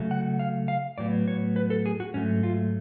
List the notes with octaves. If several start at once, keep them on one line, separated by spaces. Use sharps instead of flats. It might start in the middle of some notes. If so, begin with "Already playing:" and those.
Already playing: C#3 F#3 A3
F#5
F5
F5
A2 F#3 B3 D5
C#5
B4
A4
G#4
F#4
G#2 F#3 A3 C#4
F4